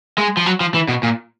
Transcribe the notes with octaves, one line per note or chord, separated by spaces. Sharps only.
G#3
F3
F#3
F3
E3
B2
A#2